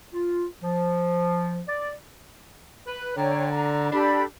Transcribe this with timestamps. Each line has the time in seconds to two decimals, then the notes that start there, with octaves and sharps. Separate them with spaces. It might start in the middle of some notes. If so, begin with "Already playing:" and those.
0.14 F4
0.63 F3
1.68 D5
2.86 B4
3.16 D3 C#5 G5 A#5
3.51 A#5
3.92 D4 G4 A4 B5